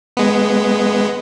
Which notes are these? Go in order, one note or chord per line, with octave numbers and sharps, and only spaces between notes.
G#3 B3